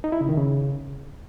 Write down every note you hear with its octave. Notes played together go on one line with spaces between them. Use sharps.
D#4
E4
C#3
D#3
C#3